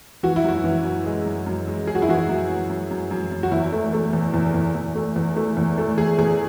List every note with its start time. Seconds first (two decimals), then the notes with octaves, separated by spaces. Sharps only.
0.23 E3 F#4
0.36 E4
0.44 F#2 F#4
0.64 E3
0.84 F#2
1.06 G#3
1.26 F#2
1.46 F#2
1.67 G#3
1.87 F#2 G#4
1.95 F#4
2.02 E4
2.09 E3 F#4
2.29 F#2
2.49 F#2
2.70 F#2
2.91 F#2
3.11 F#2
3.32 F#2
3.43 F#4
3.52 E2 E4
3.73 A3
3.93 A3
4.13 E2
4.34 E2
4.54 E2
4.75 E2
4.95 A3
5.16 E2
5.36 A3
5.57 E2
5.78 A3
5.98 E2 G#4
6.18 E2 G#4